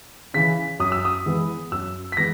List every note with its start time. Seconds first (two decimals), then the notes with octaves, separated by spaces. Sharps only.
0.34 C#3 E3 B6
0.79 F#2 D#6
0.92 E6
1.05 D#6
1.26 E3 G#3 B3
1.72 F#2 E6
2.12 B6
2.17 E3 G#3 B3 A#6